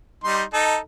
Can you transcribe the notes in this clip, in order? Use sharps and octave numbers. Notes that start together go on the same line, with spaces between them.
G3 D#4 C6
D#4 A4